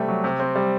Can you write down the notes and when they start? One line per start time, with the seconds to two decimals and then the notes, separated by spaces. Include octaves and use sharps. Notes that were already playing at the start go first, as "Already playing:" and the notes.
Already playing: C3 G3 A3 G5
0.08 F#3
0.24 C3
0.40 C4
0.56 G3